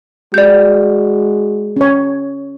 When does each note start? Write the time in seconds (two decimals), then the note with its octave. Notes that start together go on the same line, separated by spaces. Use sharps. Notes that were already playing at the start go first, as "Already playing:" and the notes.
0.34 G#3 F#4 D5 G6
1.76 C#4 C#5